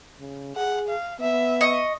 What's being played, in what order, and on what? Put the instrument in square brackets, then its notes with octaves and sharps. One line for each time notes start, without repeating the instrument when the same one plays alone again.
[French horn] C#3
[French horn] G#4 [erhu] F#5
[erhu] F5
[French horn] B3 [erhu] E5
[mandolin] D#5 C#6